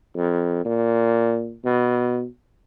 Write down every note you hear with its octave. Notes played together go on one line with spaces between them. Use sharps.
F2
A#2
B2